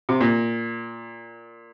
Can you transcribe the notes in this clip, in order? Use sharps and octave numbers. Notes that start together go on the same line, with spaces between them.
C3
A#2